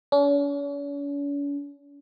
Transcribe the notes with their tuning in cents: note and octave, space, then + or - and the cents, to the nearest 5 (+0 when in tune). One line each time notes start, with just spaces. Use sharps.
C#4 +45